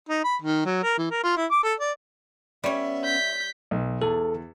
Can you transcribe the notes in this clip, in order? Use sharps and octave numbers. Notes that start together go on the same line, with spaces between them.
D#4
B5
D#3
F#3
A#4
E3
A#4
F4
E4
D6
A4
D5
G3 B3 C#4 C#5 E5
G6 B6
B1
E2 A4